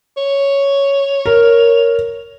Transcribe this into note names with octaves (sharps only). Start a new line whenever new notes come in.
C#5
A#4